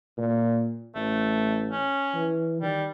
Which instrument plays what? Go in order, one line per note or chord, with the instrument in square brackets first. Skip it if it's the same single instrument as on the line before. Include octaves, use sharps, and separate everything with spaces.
[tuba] A#2
[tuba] A1 [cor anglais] A3
[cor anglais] C#4
[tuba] E3
[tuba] D#3 [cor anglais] G3